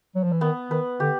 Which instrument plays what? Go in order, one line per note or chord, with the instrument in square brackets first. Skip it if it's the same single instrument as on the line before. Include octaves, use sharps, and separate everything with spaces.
[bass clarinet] F#3
F3
E3
[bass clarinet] D#3 [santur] B3
[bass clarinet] D#3 [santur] B4
[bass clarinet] D3 [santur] G4